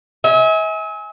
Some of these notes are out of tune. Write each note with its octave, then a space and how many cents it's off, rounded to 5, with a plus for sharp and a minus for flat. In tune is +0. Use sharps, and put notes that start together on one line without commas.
E5 -45 G#5 +0